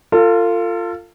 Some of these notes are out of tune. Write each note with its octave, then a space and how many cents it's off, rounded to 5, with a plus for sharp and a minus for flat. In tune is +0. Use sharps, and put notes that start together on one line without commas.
F4 -5 A4 +35